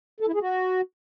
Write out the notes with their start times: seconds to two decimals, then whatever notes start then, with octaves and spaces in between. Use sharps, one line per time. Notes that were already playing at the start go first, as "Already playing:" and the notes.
0.20 A4
0.27 E4
0.34 G#4
0.42 F#4